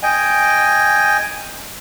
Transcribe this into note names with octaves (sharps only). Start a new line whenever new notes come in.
D#5 G5 G#5